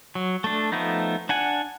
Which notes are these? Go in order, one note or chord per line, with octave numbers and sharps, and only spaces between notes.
F#3
A3 D4
F3 A3 B3 D#4
D4 F#5 G#5